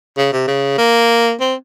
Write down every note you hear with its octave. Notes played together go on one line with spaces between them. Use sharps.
C#3
C3
C#3
A#3
C4